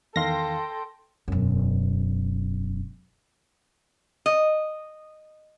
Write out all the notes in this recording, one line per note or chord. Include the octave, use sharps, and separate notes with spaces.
E2 D#3 A4 F5 G5 C6 A#6
E1 F#2
D#5